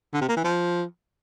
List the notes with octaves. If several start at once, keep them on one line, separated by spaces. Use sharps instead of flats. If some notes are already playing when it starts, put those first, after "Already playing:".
D3
C3
A#3
E3
F3